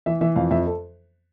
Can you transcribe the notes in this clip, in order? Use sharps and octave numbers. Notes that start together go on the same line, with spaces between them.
E3 E5
E3 E5
F2 F5
F2 E5
A4